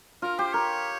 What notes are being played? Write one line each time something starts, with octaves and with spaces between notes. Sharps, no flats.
F4 A#4
G4 C5
A#4 C#5